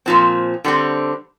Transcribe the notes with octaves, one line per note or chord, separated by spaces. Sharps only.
A#2 F3 C4
D3 G3 C4